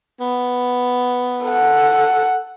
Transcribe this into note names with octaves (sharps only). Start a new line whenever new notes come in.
B3
A4 F#5